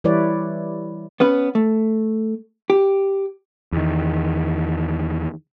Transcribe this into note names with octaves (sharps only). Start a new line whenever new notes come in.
E3 G3 E4 B4 C#5 D5
B3 C#4 B4
A3
G4
E2 D#3